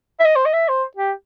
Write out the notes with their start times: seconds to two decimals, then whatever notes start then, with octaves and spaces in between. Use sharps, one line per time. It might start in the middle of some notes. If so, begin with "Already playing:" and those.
0.20 E5
0.25 D#5
0.36 C5
0.45 D#5
0.53 E5
0.68 C5
0.97 G4